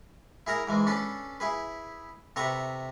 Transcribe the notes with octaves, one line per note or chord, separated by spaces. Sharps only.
E4 G#4 A#4 A#5
G#2 E3 G#3
C#4 D4 A4 B4
E4 G#4 B4
C3 A4 B4 E5 A#5 C#6